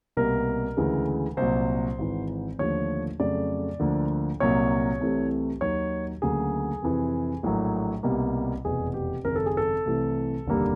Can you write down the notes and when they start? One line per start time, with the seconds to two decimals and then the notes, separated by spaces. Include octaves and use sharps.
0.17 C2 B2 G3 A#3 A#4
0.77 D2 C#3 E3 G#3
1.37 C2 A#2 F#3 C5
1.98 G#1 G#2 E3
2.58 D#2 D3 F3 A3 C#5
3.20 F2 C#3 F#3 A3 D5
3.80 D2 D3 F3 A#3
4.40 C2 A#2 F#3 A#3 C#5
5.00 C2 C3 E3 A3
5.61 D#2 D#3 F#3 C#5
6.22 D2 C#3 F#3 A#3 G#4
6.82 F2 C3 E3
7.43 A#1 A2 F#3 A#3
8.03 C2 B2 G3 A#3
8.65 F1 E2 B2 G#4
8.94 G4
9.24 G#1 F#2 C#3 A#4
9.36 A4
9.46 G#4
9.57 A4
9.85 C2 C3 E3 A3
10.46 F1 D#2 D3 G3 A#3